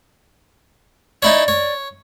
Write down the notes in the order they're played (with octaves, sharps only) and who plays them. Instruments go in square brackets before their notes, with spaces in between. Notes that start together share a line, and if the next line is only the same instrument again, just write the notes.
[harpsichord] D#4 E4 C#5 [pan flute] D5
[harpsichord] C#5